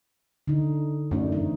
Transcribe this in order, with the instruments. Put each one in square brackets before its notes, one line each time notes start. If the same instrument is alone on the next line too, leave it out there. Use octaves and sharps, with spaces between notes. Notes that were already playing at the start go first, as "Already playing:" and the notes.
[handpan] D3 D#4
[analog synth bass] F#2 [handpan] A3 D4 D#4
[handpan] E3 C4 D#4